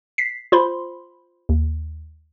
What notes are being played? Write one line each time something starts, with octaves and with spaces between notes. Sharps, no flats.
B6 C7
F4 C5 B5 C6
D#2